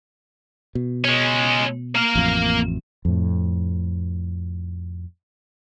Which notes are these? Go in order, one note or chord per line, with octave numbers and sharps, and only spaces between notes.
B2
G#3 C#4
A#3 F5
A1 F2
F2 A2